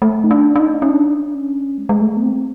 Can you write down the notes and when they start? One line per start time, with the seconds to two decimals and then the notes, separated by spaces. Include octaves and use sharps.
0.02 A3
0.24 D#4
0.31 D4
0.56 D4
0.60 D#4
0.82 C#4
0.90 D4
1.35 C#4
1.78 G#3
1.89 G#3
2.01 A3
2.17 B3
2.22 C4